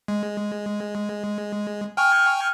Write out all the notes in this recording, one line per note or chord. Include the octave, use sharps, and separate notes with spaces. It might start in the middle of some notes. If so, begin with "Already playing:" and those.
G#3
G5 G#5 C#6 F6